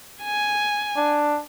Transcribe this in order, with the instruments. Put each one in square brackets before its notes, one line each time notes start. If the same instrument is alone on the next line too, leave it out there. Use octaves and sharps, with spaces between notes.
[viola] G#5
[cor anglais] D4